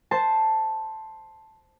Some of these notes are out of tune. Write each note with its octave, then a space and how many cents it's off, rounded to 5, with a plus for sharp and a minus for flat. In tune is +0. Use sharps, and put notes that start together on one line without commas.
C5 +0 A5 +0